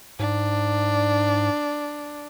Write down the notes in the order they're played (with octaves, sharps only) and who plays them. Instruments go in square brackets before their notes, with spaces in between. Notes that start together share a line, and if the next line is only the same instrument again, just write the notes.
[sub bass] G#2 [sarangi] D4